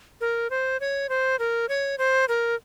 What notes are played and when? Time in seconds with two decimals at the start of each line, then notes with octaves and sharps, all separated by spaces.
0.21 A#4
0.50 C5
0.80 C#5
1.09 C5
1.39 A#4
1.69 C#5
1.98 C5
2.29 A#4